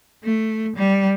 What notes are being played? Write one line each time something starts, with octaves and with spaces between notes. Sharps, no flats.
A3
G3